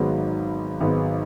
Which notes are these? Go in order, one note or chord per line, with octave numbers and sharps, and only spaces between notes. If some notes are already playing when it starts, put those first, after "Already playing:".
Already playing: G#1 G#2 F#3 B3
G#1 G#2 F#3 B3